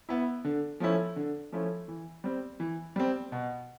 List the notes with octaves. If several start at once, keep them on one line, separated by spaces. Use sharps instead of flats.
B3 E4
D3
F3 A3 C#4 E4
D3
F3 A3 C#4 E4
E3
G3 C4
E3
G3 C4
B2